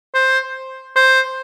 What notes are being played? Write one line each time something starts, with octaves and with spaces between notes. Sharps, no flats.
C5
C5